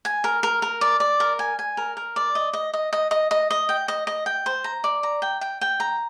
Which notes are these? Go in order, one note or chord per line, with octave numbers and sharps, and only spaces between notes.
G#5
A#4
A#4
A#4
D5
D5
A#4
G#5
G#5
A#4
A#4
D5
D#5
D#5
D#5
D#5
D#5
D#5
D#5
G5
D#5
D#5
G5
C5
A#5
D5
A#5
G5
G5
G5
A#5